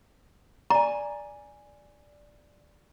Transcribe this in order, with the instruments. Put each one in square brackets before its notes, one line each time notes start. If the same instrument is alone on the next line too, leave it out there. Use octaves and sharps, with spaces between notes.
[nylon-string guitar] D5 G#5 [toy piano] A#5